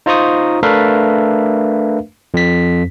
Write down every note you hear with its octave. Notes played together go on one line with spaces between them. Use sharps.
D#4 F4 C5 A#5 C#6 D#6
A3 D4 A#4 B4 E5 F5
F2 B6